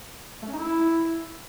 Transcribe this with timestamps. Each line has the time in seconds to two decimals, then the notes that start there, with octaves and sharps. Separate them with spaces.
0.43 A3
0.48 C#4
0.53 D#4
0.58 E4